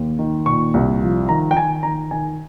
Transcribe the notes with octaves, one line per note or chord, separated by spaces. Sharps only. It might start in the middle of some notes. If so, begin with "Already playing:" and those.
Already playing: D#2
D#3
A#2 C#6
C2
F3
D#3 A#5
G5
D#3 G#5
D#3 A#5
D#3 G#5